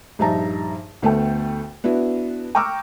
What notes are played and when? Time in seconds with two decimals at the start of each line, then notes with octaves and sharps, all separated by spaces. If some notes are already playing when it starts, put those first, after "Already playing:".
0.19 A#1 G2 D#4 E5 A5 A#5
1.02 D2 A3 B3 A4 G5
1.84 B3 D4 E4 F#4
2.55 G5 A#5 C#6 D6 E6 F6